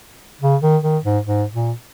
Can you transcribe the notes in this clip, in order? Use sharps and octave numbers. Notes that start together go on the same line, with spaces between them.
C#3
D#3
D#3
G#2
G#2
A#2